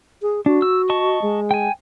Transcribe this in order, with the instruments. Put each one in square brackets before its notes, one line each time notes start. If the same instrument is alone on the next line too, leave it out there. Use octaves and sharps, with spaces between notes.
[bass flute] G#4
[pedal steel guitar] D4 [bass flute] F#4
[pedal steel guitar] E6
D#5 A5 C#6
[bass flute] G#3
[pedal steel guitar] G5 G#5